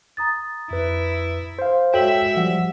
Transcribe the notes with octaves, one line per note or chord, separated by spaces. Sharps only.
A#5 D#6 A6
F2 E4 B4
C5 F5
G#3 F#4 A4 C#5 E5 G5 F#7
F3 G3 F#5